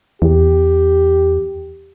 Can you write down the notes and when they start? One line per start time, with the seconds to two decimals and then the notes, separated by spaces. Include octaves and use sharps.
0.22 E2 G4